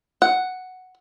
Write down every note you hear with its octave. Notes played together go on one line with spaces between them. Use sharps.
F#5